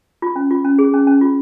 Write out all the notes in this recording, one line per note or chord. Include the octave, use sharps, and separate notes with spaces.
F4
C#4
F4
C#4
G#4
C#4
C#4
F4